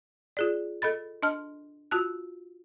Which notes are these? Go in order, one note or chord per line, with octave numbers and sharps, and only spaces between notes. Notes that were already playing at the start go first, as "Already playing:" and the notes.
F4 G#4 D5
A4 D#5 B5 A6
D4 D#5 A5 F6
F4 F#4 A5 F#6